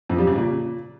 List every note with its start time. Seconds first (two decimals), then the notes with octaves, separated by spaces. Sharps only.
0.09 F2
0.18 G3
0.27 C#3
0.36 A#2